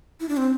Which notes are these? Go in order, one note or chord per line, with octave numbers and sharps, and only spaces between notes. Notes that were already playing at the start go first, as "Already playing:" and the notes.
E4
D4
C4